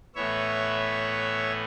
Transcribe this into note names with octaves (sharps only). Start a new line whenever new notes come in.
A2 E3 B3 C#5 E5